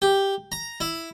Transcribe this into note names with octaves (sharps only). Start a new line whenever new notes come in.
G4
A#5
E4